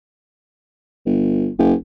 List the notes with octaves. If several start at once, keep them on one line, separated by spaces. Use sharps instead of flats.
G1
F#1